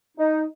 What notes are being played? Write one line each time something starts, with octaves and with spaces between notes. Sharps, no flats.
D#4